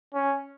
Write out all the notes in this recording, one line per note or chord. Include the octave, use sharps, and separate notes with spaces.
C#4